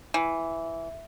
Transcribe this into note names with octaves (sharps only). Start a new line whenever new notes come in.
E3